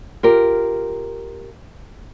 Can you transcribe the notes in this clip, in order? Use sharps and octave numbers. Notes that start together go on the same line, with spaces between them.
F4 G4 A#4